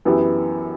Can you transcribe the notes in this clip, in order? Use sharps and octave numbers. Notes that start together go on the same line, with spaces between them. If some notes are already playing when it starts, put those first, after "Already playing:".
F#2 E3 B3 E4 G4